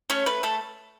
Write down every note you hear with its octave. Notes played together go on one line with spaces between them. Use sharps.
A3 C#4 C#5
A3 B4
A3 A4